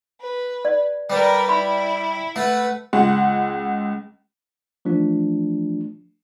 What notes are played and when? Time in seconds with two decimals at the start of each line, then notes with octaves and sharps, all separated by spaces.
0.20 B4
0.65 D5
1.10 G3 A#4 B4
1.49 E4 B5
2.36 A3 B4 F#5
2.93 C#2 G#3 F#5
4.85 E3 F3 A3 D4